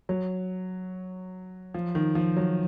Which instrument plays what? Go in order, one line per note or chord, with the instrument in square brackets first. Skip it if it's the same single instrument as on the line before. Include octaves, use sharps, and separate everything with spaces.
[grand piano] F#3
F3
D#3
F3
F#3